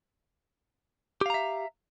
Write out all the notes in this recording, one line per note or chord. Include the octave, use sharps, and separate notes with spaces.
G4 E5 F5 A#5